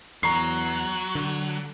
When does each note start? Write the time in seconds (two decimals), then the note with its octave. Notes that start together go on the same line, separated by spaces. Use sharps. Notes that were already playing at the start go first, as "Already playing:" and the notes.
0.23 E2 F#3 A#5 C#6 C7
1.15 D3